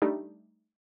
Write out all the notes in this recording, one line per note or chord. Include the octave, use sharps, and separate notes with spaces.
G3 A3 D4 D#4 G4